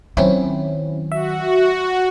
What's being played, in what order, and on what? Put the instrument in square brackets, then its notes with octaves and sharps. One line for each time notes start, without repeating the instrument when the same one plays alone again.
[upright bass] D#3 F#3 [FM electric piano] C4 C#4 E4
[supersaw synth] F#4 [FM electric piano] E5